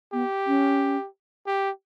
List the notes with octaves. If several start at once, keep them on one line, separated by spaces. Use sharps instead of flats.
B3 G4
C#4
G4